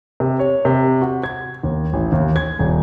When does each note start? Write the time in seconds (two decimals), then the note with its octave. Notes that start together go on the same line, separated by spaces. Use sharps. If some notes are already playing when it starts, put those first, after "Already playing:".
0.20 C3
0.39 C#5
0.65 C3
1.01 F#4
1.24 G#6
1.63 D#2
1.93 A1
2.12 D#2
2.36 G#6
2.59 D#1